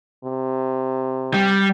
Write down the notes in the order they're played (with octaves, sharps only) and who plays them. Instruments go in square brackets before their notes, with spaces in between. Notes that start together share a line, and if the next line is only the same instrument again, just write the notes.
[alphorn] C3
[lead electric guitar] G3